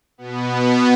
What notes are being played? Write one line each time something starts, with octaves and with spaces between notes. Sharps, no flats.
B2 B3